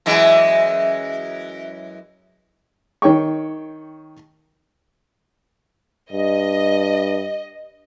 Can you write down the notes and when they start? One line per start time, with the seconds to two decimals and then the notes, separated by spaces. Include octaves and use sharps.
0.06 F#2 E3 G#3
3.02 D#3 C#5 G5 C#6
6.12 G2 D#5